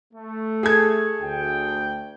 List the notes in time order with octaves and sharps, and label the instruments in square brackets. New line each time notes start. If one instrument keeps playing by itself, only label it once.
[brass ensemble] A3
[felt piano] G#4 A4 G#6
[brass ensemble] D2 G5